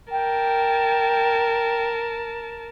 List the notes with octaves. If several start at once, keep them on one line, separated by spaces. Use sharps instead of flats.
A#4 G5 A5